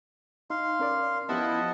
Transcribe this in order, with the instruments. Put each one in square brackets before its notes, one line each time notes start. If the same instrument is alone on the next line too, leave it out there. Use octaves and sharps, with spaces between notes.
[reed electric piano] D#4 [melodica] F5 C6
[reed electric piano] C#4 A#4 D5
[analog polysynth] F3 E4 [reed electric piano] B3 C#4 G4 [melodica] D#5 F#5 A5